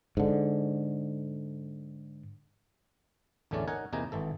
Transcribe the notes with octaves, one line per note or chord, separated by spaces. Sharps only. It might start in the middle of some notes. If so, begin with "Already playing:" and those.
G#2 D3
A1 E2 D3 A3 C#4 D5
D#4 A#4 C#5 F#5 G#5
E2 C3 A#3 D#4 G#5 A#5
G#1 E3 A4